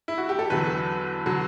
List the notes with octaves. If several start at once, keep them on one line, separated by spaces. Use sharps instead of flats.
E4
F#4
G4
A4
E2 D3 F#3 B4
D3 F#3